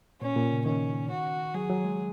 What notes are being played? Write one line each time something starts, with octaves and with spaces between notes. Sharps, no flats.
A#2 C#4
A#2
C#3
D#3 C#4
F#4
F#3 G#4
F#3
G#3